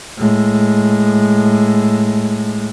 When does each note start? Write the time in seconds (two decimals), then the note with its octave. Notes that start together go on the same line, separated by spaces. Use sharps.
0.18 A2 G#3